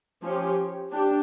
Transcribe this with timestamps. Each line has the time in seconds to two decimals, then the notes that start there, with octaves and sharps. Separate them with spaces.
0.24 F3 C#4 G4
0.92 D4 G4